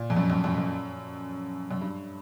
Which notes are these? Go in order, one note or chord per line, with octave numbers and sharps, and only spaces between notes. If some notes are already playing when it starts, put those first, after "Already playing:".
Already playing: A#2
F2
F#2
F#2
F#2
F#2
F#2
G2